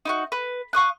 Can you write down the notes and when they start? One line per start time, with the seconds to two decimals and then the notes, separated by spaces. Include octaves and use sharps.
0.05 D#4 E4 F#4
0.32 B4
0.73 F5 C#6 D#6 F#6